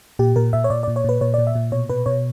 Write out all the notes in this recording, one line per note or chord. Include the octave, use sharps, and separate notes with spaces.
A#2 G4
A#2 A#4
A#2 E5
C#5
A#2 D5
D5
A#2
C#5
A#2 B4
A#2 C#5
D5
A#2
E5
A#2
B2 C#5
B2 B4
B2 C#5